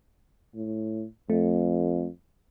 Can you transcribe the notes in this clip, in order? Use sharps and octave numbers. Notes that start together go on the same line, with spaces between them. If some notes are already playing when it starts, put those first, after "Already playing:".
A2
F2 A3